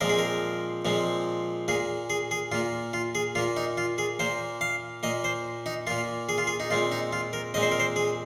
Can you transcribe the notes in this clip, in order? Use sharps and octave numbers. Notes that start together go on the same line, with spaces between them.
A#2 F3 G#3 C4 A#4
G#4
A#4
A#2 F3 G#3 C4
A#2 A#3 G#4
G#4
G#4
A#2 A#3 F4
F4
G#4
A#2 A#3 F4
D#4
F4
G#4
A#2 A#3 C5
F5
A#2 A#3 D#5
C5
D#4
A#2 A#3 F4
G#4
F4
G#4
D#4
A#2 G#3 C4 F4
D#4
F4
A#4
A#2 G#3 C4 D#5
C5
A#4
C5
G#4